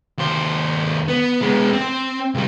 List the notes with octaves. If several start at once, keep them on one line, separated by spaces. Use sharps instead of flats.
D#2 C5
B3
G#3 B3
C4
C#2 G3